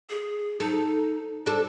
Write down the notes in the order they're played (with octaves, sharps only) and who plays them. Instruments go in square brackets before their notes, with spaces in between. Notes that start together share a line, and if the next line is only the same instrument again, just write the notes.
[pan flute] G#4
[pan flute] D#4 [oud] A4
[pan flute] G3 [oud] D4 A4